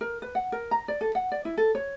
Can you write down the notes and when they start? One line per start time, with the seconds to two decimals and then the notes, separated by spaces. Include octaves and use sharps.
0.01 A#4
0.22 B4
0.35 F#5
0.52 A#4
0.71 A#5
0.88 D5
1.01 A4
1.15 F#5
1.32 D5
1.45 E4
1.57 A4
1.75 C#5